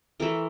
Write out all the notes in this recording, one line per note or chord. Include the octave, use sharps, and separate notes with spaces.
E3 A3 A#4